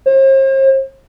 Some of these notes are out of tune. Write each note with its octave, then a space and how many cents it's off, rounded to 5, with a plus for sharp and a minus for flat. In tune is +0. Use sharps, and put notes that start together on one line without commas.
C5 +45